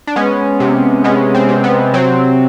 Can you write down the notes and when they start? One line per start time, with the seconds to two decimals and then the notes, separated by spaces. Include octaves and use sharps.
0.07 D4
0.16 G#3 B3 C#4
0.60 C3
1.04 G#3 B3 C#4
1.35 C4
1.49 C3
1.64 B3
1.94 F#3 C4